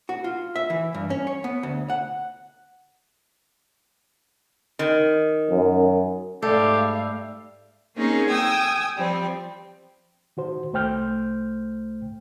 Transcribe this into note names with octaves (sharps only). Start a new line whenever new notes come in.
F#4
F4
E5
E3
G2
C#4
C#5
B3
D2
F#5
D#3
F#2
G#2 G3 A3 G4 A4 F5
A#3 C4 C#4 D#4 G#4 A#4
G5 G#5 D#6 E6
F3 G3 C4
D#3 F#4 C5
C2 A3 C5 G5 F6 G6